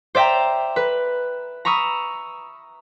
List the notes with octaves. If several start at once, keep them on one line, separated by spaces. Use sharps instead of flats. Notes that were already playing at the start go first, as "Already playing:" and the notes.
C5 D5 E5 G5 A#5
B4
A#5 B5 C#6 D#6 E6